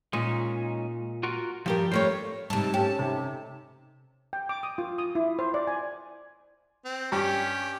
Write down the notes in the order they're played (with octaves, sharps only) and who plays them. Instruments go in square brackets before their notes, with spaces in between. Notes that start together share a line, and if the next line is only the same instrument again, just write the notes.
[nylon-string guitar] A#2 [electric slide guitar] G#3 C#4 D#4
[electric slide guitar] F4 F#4 A#4
[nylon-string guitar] G2 G4 A#4 [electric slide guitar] F3 G3
[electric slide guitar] F2 A#4 C5 [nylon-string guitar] G3 A3 C#5
[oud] G#2 C3 [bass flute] G3 [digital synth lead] A5
[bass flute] A3 [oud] C#4 [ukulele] G4
[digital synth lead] C3 [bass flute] D#4 [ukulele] A4
[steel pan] G5
D6
D#6
F4
D#6
E4
C5
D5
G#5
[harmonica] C4
[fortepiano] G2 [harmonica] C#4 G4